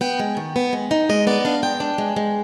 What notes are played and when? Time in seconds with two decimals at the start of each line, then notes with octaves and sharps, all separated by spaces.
0.01 B3 G5
0.20 G#3
0.37 D#3
0.56 B3
0.73 G#3
0.91 D#4
1.09 G#3 D#5
1.27 B3 D5
1.45 D4 F5
1.63 G#3 G5
1.80 D4
1.98 G#3
2.16 G#3